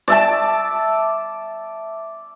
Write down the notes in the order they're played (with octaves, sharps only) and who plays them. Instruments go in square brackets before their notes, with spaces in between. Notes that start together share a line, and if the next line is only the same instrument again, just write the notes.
[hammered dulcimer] D5 E5 A5